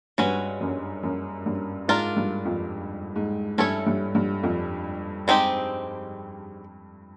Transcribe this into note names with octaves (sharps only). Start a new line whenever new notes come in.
G2 G#3 C#4 F#4 B4
F#2
F#2
G2
G#2 D4 F4 A#4
G2
F2
G#2
G2 A3 C#4 E4 A4 C#5
G2
G2
F2
G#3 C4 D#4 G4